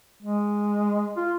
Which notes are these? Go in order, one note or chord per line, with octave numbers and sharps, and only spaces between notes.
G#3
F4